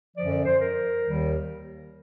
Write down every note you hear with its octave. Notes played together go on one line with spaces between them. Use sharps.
F#2 D3 F3 D5
D5
C5
A#4
D#2 D#3 G3